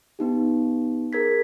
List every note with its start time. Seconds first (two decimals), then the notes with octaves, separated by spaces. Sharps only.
0.19 B3 D#4 G4
1.13 G#4 A#4 G#6 B6